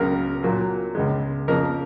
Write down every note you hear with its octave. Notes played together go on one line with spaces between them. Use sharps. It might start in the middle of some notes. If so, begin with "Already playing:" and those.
Already playing: C#2 C#3 F#3 A#3 A#4
A#2 F#3 A#3
C#2 C#3 G#3
F2 C#3 F3 A#3 A#4